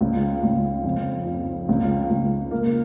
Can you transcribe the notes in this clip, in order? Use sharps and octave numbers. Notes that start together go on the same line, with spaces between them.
C#2
C#2
F2
F2
C#2
C#2
A#3